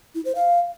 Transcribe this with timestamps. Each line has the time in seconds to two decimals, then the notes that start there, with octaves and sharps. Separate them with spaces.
0.15 E4
0.25 C5
0.35 F5